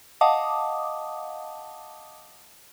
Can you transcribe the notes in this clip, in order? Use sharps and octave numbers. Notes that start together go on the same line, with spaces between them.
D#5 F5 F#5 A5 D6 D#6